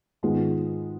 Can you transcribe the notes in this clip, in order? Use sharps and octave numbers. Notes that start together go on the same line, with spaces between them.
G#2 D#3 G#3 B3 F4